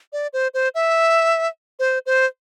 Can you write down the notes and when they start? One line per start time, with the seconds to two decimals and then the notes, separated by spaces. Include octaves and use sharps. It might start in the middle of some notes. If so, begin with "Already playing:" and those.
0.13 D5
0.33 C5
0.54 C5
0.75 E5
1.79 C5
2.06 C5